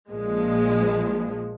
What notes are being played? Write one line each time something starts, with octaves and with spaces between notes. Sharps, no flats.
A#1 A#2 F3 G#3